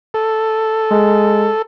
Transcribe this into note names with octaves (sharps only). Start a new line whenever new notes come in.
A4
G#3